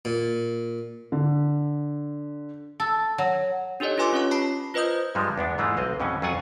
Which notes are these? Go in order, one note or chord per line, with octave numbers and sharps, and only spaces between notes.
A#2
D3
A4
F#3
D4 D#4 G4 A4 C#5 D#5
F4 G4 B4 G#5 C6 D6
C#4 F4 C#5 C#6
A5 B5 C7
F4 B4 C5 D#5 D#6 G6
G2 F3 G3 G#3
E2 B3 D4
G#2 E3 G#3 A3 F4
B1 C4 D#5
F2 B2 E3 C#4
F2 F#3 F4 F#5 G#5